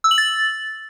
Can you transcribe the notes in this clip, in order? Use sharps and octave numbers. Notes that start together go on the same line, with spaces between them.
E6
F#7
A6